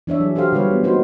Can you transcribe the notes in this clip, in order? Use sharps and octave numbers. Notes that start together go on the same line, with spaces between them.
E3 D4 C#5 E5
F#3 G#4
F#4 G4 A4 C5 F5
D3 G3 F4 B4 C#5
B3
A#3 C4 D#4 F#4 B4 C5